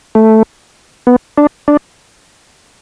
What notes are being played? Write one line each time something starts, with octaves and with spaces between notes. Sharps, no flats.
A3
B3
D4
D4